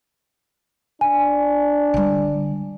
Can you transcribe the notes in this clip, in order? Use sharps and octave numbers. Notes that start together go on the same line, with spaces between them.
D4 D5 G#5
D3 G3